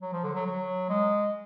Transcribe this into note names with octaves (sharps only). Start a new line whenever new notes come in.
F#3
F3
D3
F#3
F#3
G#3